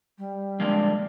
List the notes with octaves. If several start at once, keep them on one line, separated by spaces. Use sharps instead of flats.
G3
F3 G#3 A#3 D4